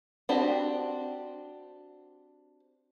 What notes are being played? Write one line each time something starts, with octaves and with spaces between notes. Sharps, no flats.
C4 D4 F#4 G4